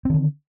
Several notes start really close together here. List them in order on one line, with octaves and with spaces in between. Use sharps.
C4 D#3 D3